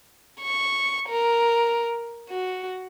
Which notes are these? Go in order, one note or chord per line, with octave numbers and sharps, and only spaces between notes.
C#6
A#4
F#4